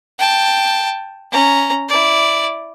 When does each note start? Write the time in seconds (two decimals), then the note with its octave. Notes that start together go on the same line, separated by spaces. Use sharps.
0.19 G5 A5
1.31 C#4 A#5
1.89 E4 D5